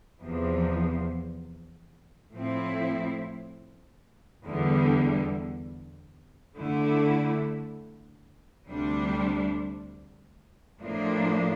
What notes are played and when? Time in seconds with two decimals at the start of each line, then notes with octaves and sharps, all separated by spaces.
0.20 E2 C3 F3
2.32 A2 F3 C4 E4
4.44 E2 D3 G3
6.57 D3 A3 E4
8.69 D2 C3 G3 D4
10.81 A2 F3 A#3 D4